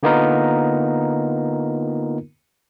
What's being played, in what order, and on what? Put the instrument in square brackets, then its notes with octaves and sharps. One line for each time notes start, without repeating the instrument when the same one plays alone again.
[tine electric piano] D3 A#3 B3 D#4 F4 A#4